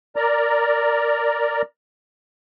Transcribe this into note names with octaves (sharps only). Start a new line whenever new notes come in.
A#4 D5 A#5